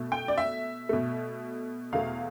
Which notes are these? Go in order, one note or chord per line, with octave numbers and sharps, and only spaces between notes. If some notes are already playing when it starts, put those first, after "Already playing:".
Already playing: B2 A3
G5
D5
E5
B2 A3
E2 B2 A3 F5